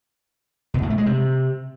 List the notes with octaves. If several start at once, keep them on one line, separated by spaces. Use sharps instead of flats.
B2
A2
A3
G#3
C3